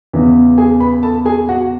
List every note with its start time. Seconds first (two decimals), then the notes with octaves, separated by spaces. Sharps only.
0.13 E2 C#3 E3 B3
0.58 G#4 G#5
0.80 B4 B5
1.03 A4 A5
1.25 G#4 G#5
1.49 F#4 F#5